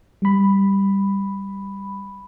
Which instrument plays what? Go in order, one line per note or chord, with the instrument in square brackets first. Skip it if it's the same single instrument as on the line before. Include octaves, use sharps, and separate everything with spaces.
[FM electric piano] G3 B5